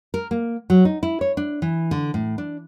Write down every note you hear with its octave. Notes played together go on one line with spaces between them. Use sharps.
A#4
A#3
F#3
D#4
E4
C#5
D4
E3
D3
A2
D4